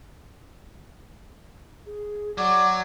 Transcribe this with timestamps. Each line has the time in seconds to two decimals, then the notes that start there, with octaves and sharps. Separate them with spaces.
1.86 G#4
2.38 F#3 D5 F#5